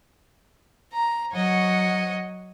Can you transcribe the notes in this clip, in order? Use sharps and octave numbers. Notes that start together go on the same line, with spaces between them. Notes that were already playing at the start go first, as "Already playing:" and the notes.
A#5
F#3 C#5 D#5 F#5